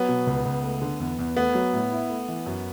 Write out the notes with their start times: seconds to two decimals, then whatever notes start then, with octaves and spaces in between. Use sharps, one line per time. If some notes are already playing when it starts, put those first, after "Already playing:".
Already playing: F#3 B3
0.09 B2
0.27 C#2
0.45 C#2
0.64 A3
0.82 D3
1.00 E2
1.19 E2
1.37 A3 B3
1.55 F#3
1.73 A2
1.92 E4
2.10 A3
2.28 E3
2.46 F#2